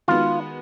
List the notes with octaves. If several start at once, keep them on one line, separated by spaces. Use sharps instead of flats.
D#3 G#3 B3 F4 F#4